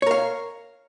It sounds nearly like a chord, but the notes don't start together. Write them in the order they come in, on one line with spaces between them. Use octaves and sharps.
C#5 A#4 F5